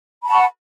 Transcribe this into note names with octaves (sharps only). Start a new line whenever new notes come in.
F#5 A5 B5 C#6